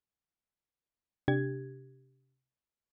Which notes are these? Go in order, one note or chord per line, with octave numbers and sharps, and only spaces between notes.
C3 D4 G4 G#6